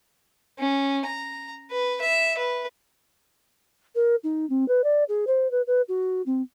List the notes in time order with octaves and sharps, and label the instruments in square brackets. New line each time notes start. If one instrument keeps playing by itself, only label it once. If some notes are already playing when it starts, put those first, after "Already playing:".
[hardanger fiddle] C#4
A#5
B4
E5
B4
[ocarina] A#4
D#4
C4
B4
D5
G#4
C5
B4
B4
F#4
C4